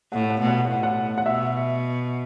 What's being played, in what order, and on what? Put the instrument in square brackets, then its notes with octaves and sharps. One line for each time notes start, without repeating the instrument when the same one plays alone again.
[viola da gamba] A2 [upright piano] F#5
[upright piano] F#5
[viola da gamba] B2
[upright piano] F#5
[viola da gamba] A2 [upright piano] F#5
[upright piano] F#5
F#5
[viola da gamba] B2 [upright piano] E5